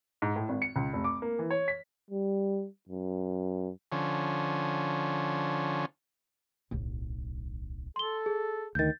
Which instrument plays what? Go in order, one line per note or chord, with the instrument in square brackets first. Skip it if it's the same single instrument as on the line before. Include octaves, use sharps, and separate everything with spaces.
[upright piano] G#2
A2
G#1
C#7
C#2
F1
D6
A#3
E3
C#5
B6
[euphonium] G3
F#2
[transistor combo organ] D3 F3 C#4
[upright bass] D1 B1
[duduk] A4 [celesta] C6 G7
[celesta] G#4
[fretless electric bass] D2 D#3 [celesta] G6 A6